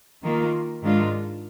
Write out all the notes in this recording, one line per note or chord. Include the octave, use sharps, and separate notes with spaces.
D#3 A#3 F4
G#2 D#3 G#3 D4 F4